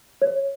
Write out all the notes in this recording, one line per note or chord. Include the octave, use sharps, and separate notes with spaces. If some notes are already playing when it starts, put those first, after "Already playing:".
C#5